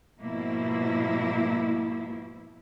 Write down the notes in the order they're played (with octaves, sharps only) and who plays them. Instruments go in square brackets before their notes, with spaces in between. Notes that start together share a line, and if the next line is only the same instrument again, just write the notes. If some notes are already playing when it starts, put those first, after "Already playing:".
[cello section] G#2 B2 F3 A#3 E4